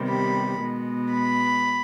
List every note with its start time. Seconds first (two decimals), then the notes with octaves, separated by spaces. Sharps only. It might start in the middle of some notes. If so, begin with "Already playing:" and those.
Already playing: C3 D#3 G3 B3
0.10 B5
0.61 B2 G#3 B3
1.12 B5